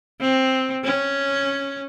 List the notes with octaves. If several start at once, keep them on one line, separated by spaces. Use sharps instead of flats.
C4
C#4